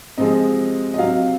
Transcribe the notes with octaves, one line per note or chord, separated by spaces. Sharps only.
C3 F3 G#3 D#5
D#5
C3 F#3 F5